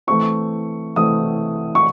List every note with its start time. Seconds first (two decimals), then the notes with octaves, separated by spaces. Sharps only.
0.07 E3 A3 C4 C#6
0.96 E3 A3 C4 D#6
1.75 C#6